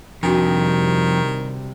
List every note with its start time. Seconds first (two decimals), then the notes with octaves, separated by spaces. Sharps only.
0.23 F2 C3 D#3 G3 D4 F4 F#4